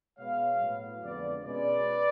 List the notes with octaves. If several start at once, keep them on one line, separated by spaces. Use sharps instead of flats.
B2 G#3 B3 C#5 F5
A2 F#3 B3
F2 D3 G#3 B3 B4 D5
B2 G#3 C#4 B4 D5